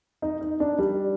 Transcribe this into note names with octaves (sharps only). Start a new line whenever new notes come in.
D#4
D#4
D4
G3